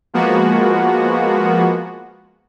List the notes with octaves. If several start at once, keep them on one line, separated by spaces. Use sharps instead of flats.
F3 G#3 A#3 B3 F#4